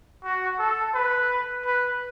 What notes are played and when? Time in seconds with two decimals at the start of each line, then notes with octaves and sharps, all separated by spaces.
0.24 F#4
0.59 A4
0.94 B4
1.66 B4